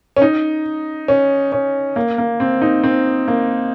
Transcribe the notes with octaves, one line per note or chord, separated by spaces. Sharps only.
C#4
D#4
C#4
C#4
A#3
A#3
C4
D#4
C4
A#3